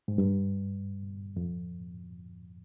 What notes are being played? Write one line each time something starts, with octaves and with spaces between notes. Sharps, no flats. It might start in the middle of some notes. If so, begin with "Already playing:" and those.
G#2
G2
F2